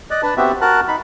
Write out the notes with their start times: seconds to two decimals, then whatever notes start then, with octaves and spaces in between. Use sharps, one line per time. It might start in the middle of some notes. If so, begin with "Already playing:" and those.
0.11 D5 D#5 F#6
0.23 D4 B4 A5
0.37 B3 C4 F#4 G4 E5
0.61 F#4 A#4 A5 F#6
0.88 D#4 B5